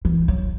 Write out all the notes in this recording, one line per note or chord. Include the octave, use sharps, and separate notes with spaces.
E3
F#3